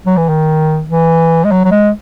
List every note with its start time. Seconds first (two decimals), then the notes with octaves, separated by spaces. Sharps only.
0.06 F#3
0.17 E3
0.29 D#3
0.90 E3
1.45 G#3
1.52 F#3
1.65 F#3
1.72 G#3